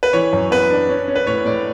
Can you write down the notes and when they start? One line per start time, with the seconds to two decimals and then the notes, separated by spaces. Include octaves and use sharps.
0.03 B4
0.13 E3 C#5
0.33 F#2
0.51 B3 B4
0.70 D4
0.89 C#4
1.08 C#4
1.16 B4
1.27 A2 C#5
1.46 A2 D5